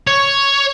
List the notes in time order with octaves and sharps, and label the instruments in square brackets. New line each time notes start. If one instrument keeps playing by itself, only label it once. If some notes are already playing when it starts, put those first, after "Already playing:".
[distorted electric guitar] C#5